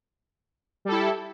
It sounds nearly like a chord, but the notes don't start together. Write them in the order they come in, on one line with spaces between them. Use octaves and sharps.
G3 A4 E4